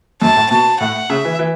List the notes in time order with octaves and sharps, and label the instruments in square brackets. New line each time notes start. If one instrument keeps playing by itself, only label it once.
[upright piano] F#2 [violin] A5
[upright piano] A2
[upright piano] B2 [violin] A5
[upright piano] A2 [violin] F#5
[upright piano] C#3 [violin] E5
[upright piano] E3
E3